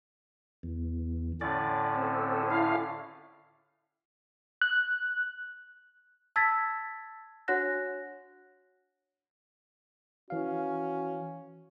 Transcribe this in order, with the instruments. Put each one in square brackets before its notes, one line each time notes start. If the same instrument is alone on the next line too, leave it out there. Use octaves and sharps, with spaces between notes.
[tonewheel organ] E2
[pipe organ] A2 D3 C#4 [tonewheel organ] D5
[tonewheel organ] C4 A4
E4 F5
[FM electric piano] F#6
[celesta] A5 E6 G#6 A6 B6
D4 F#4 C#5 F#5 F#6 A#6
[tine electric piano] E3 F5 [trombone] C#4 [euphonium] F#4